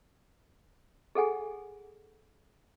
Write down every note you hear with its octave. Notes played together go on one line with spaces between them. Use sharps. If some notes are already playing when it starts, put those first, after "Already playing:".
G#4 A4 F#5 G#5